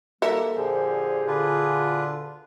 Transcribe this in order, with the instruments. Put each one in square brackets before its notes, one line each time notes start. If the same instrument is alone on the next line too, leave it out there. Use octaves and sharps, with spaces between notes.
[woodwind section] D#3 G3 A#3 [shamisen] A4 A#4 E5
[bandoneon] A#2 D3 F3 [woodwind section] G4 C5 [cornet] G#4
[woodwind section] D2 A#2 D3 [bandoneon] D4 F4 B4